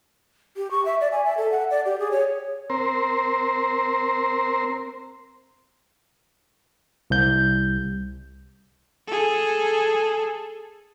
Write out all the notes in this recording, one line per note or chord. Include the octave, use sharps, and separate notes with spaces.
G4
C#6
E5
D5
G#5
E5
A4
F#5
D5
G4
G#4
C#5
C4 A#4 C5
C2 G6
G#4 A4